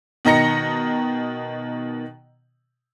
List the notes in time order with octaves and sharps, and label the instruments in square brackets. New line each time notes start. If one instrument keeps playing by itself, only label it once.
[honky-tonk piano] B2 D#3 D#5 A#5 A#6 C#7